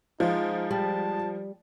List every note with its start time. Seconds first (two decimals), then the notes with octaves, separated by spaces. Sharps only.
0.20 F3 G#3 D#4 F4 G#4
0.71 G3 A5